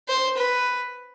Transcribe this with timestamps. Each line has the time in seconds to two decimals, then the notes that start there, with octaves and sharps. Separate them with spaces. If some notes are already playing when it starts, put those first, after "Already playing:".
0.08 C5
0.37 B4